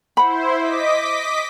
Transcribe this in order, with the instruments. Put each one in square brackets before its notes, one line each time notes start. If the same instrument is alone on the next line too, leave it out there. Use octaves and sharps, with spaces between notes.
[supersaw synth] E4 C5 [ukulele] F#5 B5
[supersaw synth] D#5 D6 B6